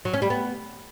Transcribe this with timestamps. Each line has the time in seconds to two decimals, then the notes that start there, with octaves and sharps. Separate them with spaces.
0.05 F#3
0.14 C#4
0.22 G3
0.30 B3